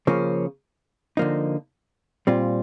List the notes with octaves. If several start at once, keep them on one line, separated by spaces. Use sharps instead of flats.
C#3 F3 A#3 C#4
D3 F3 A#3 D#4
A#2 G3 C4 F4